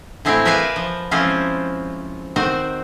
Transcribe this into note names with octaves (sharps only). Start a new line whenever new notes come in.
A2 G#3 C4 E4 C#5 G5
A#4 B4 D5 E5 F5 G#5
F3
F3 G#3 C4 C#4 E4 F4
D#3 C4 F#4 C5